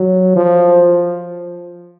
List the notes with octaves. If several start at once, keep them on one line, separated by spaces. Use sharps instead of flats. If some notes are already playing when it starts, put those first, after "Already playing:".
Already playing: F#3
F3